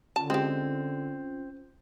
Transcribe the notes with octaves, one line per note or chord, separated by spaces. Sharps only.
D3 C#4 F4 A5
G#3 C4 G4